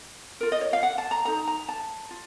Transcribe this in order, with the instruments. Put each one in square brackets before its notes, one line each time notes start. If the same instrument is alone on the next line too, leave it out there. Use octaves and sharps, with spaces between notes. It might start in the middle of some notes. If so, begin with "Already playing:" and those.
[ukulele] F4 A#4
D#5
C#5
F5
F#5
A5
A#5
D#4 A4 A#5
A#5
A5
F4